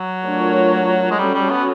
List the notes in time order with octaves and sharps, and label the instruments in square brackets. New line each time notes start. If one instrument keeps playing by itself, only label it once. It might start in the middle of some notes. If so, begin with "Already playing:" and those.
Already playing: [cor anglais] F#3
[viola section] A3 D4 F4 A#4 C#5
[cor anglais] G#3
[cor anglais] G3 [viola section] C#4 F#4 A4 C#5
[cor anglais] G3
B3